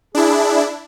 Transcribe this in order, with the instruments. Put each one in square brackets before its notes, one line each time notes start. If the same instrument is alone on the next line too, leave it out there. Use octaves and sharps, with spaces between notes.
[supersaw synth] D4 E4 [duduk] G#4